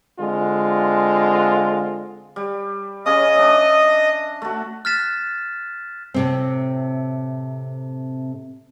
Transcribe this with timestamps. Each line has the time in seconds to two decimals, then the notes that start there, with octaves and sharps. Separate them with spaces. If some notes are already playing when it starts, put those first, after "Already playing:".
0.18 D3 G#3 C4 F4
2.36 G3
3.06 C#3 C#4 D#5 D#6
3.36 D4 E5
4.42 A3 F#4
4.85 F6 F#6 A6 B6 E7
6.14 A2 C3 C4